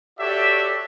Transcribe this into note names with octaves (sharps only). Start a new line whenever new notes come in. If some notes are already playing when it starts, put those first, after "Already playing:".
F#4 G4 A4 C#5 D5 E5